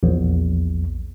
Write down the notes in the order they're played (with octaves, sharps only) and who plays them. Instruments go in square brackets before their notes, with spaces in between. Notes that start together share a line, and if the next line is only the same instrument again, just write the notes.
[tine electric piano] A#1 E2